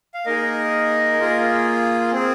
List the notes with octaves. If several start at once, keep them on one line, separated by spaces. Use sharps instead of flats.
F5
A#3 D#4 G#4 A#4 D#5
A#3 F4 G#4
C4 G#4